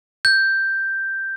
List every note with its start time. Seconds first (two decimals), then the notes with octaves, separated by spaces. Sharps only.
0.25 G6